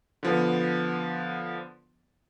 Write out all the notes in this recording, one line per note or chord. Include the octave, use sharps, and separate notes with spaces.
D3 F3 B3